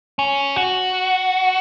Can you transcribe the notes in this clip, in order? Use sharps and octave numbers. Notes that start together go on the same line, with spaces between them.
C#4
F#4